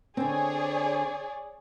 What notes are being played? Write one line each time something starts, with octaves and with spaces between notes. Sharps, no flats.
D3 C4 G#4 C#5 D5